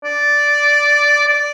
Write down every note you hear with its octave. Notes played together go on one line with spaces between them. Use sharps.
D5
D5